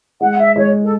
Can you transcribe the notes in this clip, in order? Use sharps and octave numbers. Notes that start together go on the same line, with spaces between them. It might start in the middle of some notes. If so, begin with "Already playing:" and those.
G#3 F#5
E5
G#3 C#5
A4